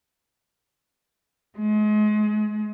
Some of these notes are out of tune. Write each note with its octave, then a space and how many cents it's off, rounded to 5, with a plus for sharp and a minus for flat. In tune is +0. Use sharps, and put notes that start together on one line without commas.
G#3 +35